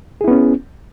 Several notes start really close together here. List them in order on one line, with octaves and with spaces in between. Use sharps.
G#4 E4 B3 C#4